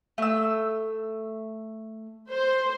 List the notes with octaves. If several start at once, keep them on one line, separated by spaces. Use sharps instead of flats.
A3 E6
C5